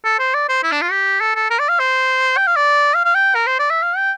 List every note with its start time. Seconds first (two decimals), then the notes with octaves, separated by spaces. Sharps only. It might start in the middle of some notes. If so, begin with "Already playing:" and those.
0.04 A4
0.19 C5
0.34 D5
0.49 C5
0.63 E4
0.72 D4
0.81 F4
0.91 G4
1.21 A4
1.35 A4
1.50 A#4
1.59 D5
1.69 F5
1.79 C5
2.37 G5
2.47 F5
2.56 D5
2.95 F5
3.05 F5
3.15 G5
3.35 A#4
3.46 C5
3.59 D5
3.70 E5
3.83 F5
3.97 G5